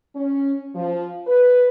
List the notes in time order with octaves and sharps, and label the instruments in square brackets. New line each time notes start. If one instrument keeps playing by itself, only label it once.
[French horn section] C#4
F3
B4